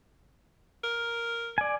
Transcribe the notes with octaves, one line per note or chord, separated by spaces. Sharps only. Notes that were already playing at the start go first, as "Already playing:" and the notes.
A#4
D5 G#5